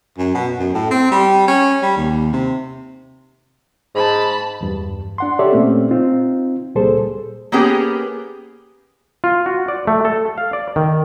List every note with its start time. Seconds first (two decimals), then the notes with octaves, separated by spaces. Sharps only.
0.18 F#2
0.35 B2
0.59 F#2
0.74 A2
0.91 C4
1.11 G3
1.48 C#4
1.82 G3
1.97 D#2
2.33 C3
3.95 G#2 A5 B5
4.61 E2 G2
5.18 D4 F#5 C6
5.39 G4 A4 C#5 D5 E5
5.52 A#2 A3 C4 C#4
5.91 C4 D#4 F4
6.75 C#2 A#2 G3 G#4 A4 C5
7.52 A#3 B3 C#4 G4 G#4
9.24 F4
9.46 F#4
9.68 D5
9.87 A3
10.05 A4
10.38 F5
10.53 D5
10.76 D#3